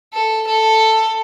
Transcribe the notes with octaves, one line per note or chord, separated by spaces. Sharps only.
A4
A4